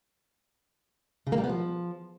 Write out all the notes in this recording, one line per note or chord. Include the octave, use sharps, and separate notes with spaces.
C#3
A#3
G3
B3
F3